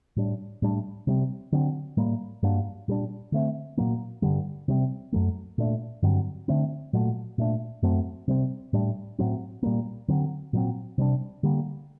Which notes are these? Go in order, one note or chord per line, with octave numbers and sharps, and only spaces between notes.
A2 G3 D4
A2 G3 D4
C3 G3 C4
D3 F#3 C4
A2 G3 A#3
G2 F#3 A#3 D4
A#2 G3 D4
D3 A3 C4
A#2 F#3 A#3
G2 D3 G3
C3 G3 C4
F#2 F#3 A3
A#2 A3 D4
G2 D3 F#3 C4
D3 A3 C4
A#2 F#3 A3
A#2 A3 D4
F#2 F#3 A3 C4
C3 G3 C4
A2 G3 D4
A2 F#3 C4
A#2 G3 A#3
D3 F#3 C4
A#2 F#3 C4
C3 G3 D4
D3 G3 A#3